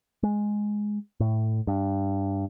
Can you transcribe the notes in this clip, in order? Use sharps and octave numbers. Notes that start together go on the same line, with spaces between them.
G#3
A2
G2